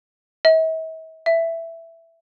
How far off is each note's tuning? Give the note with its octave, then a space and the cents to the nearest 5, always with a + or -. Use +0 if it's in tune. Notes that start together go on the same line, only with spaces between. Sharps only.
E5 -45
E5 +5